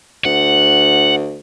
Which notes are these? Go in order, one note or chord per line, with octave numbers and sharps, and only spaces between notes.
D2 F#5